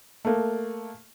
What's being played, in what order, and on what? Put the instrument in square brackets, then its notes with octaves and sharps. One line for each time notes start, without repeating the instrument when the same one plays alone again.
[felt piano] A3 A#3